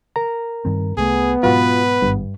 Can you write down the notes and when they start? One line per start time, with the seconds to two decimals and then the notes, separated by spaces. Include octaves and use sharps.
0.16 A#4 A#5
0.65 G2 D#3 C4
0.97 C2 A3 B3 G#4
1.43 G#2 B2 F#3 F4 F#4 B4
2.02 G#1 G2